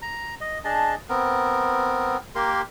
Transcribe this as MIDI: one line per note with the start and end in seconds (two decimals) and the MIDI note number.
0.02 0.35 82
0.41 0.58 75
0.65 0.95 62
0.65 0.95 68
0.65 0.95 75
0.65 0.95 81
1.09 2.17 59
1.09 2.17 60
1.09 2.17 70
2.35 2.62 58
2.35 2.62 67
2.35 2.62 70
2.35 2.62 84